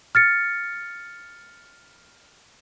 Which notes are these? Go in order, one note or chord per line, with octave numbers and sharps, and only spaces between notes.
F6 A6 C#7